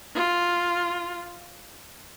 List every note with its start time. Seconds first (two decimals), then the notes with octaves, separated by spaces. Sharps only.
0.15 F4